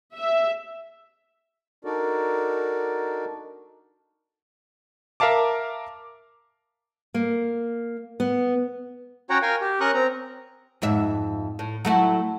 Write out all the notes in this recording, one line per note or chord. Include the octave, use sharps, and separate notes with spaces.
E5
D4 D#4 F#4 A4 A#4 D5
A#4 E5 F5 A5 D6
A#3
B3
C#4 F#4 C#5 F#5 G5 A#5
A#4 F5 G5 G#5
G4
C#4 A#4 C#6 D#6 F#6
C4 A#5
F2 G#2 E5
A2
F#3 A3 E4